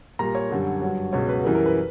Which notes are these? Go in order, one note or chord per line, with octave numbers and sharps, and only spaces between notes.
A#2 G3 A#5
C#5
F#2 D3 G3
G2 F#3
C#2 B2 F#3 C#5
B4
F#2 E3 G3 A#4
A#4
B4